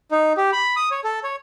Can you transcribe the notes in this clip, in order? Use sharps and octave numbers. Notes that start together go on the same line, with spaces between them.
D#4
G4
B5
D#6
C#5
A4
C#5